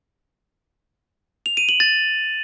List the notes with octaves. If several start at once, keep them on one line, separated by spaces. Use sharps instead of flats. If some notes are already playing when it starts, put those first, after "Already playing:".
F7
D#7
F#7
A6